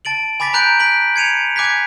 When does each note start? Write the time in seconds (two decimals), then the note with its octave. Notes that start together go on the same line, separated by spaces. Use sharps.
0.05 A5 A6 D7 F#7
0.40 G#5 B5 D6 A6 B6
0.53 A#5 B5 F#6 G6 D7 F#7
0.80 F#6 B6 D7 F#7
1.16 G#6 C#7 D#7 F7
1.56 G#5 D6 F#6 G#6 B6